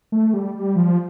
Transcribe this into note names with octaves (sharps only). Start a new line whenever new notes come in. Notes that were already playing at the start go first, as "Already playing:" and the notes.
A3
G3
G3
F3